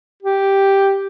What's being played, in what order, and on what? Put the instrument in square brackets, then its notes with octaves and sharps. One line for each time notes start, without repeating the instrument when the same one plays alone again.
[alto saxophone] G4